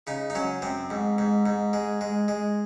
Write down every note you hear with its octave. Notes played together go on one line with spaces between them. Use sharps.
C#3 D#4
D#4
F#3 C#4
F#2 C4
G#2
G#2
G#2
G#3
G#3
G#3